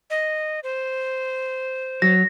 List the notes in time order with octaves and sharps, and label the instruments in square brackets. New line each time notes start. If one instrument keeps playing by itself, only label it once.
[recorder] D#5
C5
[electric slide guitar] F#3 [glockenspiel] A#6